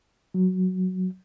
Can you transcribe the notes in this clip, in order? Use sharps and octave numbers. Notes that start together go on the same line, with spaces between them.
F#3